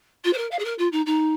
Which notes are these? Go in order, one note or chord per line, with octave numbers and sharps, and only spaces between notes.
F4
C5
A#4
F5
G#4
A#4
F4
D#4
D#4